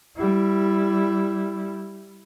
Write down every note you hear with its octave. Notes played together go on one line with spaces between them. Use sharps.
G3 E4